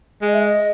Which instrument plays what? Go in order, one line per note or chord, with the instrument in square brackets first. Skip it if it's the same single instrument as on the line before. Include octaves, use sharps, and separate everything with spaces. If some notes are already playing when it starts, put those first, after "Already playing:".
[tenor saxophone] G#3 [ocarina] D#5
[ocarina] E5
D#5